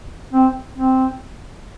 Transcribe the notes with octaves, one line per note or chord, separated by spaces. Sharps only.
C4
C4